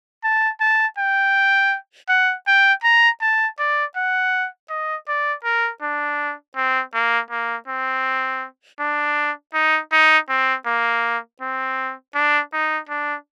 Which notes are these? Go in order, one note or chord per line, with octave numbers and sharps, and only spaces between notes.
A5
A5
G5
F#5
G5
A#5
A5
D5
F#5
D#5
D5
A#4
D4
C4
A#3
A#3
C4
D4
D#4
D#4
C4
A#3
C4
D4
D#4
D4